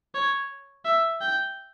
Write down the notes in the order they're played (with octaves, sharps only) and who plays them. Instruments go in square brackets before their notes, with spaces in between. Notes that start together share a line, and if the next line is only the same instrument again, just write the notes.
[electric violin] C#5
E5
G5